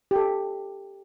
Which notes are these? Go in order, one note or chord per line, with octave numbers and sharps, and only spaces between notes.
G4
A4